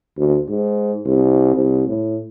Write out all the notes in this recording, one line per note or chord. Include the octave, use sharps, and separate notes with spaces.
D2
G#2
C2
C2
A2